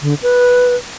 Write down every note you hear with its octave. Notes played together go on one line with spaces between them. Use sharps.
D3
B4